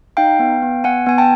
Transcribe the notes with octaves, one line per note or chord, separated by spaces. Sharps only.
D#4 F5 G5
B3
B3
B3 F#5 G#5
B3 G#5
G5 A5